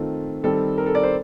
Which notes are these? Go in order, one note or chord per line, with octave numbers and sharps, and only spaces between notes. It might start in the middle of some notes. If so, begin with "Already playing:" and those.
Already playing: D#3 A3 C4 F4
D#3 G3 C4 A4
A#4
A4
D5
C5